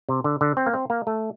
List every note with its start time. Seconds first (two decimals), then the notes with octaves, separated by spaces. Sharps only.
0.09 C3
0.24 D3
0.41 D3
0.57 C4
0.66 A#3
0.73 C4
0.90 A#3
1.07 A3